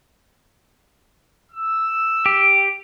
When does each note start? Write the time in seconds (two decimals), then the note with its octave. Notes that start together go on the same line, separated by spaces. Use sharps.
1.52 E6
2.26 G4